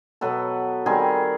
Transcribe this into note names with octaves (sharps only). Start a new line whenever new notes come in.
B2 F#3 B3 A4 B4
D#3 G3 C4 G#4 A#4